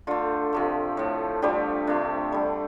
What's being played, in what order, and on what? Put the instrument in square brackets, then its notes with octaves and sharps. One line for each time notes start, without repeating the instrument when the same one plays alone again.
[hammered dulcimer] D3 A3 F4
C3 F3 A3
A2 A3
D3 F3 G3 A3 G4
C3 A3 D4
D3 G3